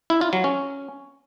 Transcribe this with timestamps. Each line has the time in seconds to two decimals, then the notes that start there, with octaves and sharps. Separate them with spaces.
0.10 E4
0.21 F4
0.33 F#3
0.44 C#4